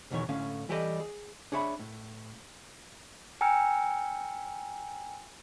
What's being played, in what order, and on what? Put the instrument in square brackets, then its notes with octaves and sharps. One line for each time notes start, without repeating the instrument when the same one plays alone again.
[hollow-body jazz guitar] B1 E2 B2 D#3 E3 C#5
A2 D3 C#4 F5
E3 G3 G4 A4 A#4 D#5
G#4
D4 G#4 C#5 E5 B5
A2
[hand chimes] G5 G#5 A#5 E6 F6 C#7